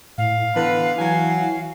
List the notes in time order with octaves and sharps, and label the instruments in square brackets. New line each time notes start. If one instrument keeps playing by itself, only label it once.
[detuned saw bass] A2 [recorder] F5
[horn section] D3 B3 B4 [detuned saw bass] E3
[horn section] F#3 G#5